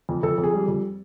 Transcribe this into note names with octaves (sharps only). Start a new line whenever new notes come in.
F2
F2 A4
F2
G#4
G3
F2